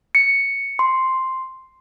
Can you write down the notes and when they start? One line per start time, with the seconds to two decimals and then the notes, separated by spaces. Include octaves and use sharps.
0.15 C#7
0.79 C6